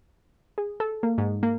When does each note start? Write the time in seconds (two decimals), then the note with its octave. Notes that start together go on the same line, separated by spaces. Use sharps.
0.58 G#4
0.80 A4
1.03 A#3
1.18 G#2
1.43 A#3